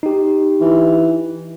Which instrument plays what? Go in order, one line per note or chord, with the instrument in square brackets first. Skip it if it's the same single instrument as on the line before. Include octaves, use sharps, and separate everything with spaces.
[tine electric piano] D#4 G4
[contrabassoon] E3